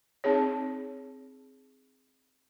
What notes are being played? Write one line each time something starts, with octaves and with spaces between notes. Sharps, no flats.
C4 D#4 G#4 C#5